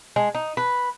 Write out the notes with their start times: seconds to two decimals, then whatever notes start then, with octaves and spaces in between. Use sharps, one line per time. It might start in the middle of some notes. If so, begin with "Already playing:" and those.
0.16 G#3
0.34 D#4
0.57 B4